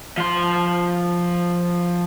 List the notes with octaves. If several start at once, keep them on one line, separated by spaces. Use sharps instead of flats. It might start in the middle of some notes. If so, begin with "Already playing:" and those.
F3 C6